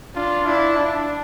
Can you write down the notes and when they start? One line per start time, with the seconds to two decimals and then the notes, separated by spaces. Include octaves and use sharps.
0.15 D4 F4
0.46 D4 E4
0.76 D4